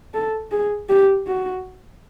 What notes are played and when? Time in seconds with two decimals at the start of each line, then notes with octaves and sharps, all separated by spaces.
0.14 A4
0.52 G#4
0.89 G4
1.27 F#4